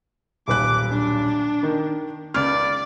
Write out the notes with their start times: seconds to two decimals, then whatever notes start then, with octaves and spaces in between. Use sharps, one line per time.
0.48 D#1 B1 D6 F#6
0.90 D4
1.63 D#3
2.34 C#2 D5 F6